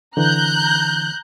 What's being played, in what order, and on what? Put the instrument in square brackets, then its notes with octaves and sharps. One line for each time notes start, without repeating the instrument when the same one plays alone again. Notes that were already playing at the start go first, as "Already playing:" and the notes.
[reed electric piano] D3 E3 [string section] A#5 F#6 G6